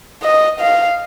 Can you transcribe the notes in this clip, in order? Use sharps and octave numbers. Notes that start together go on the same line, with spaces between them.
D#5
F5